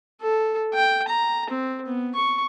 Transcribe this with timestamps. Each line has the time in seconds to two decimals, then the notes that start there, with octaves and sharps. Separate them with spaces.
0.22 A4
0.74 G5
1.08 A#5
1.50 C4
1.86 B3
2.15 C#6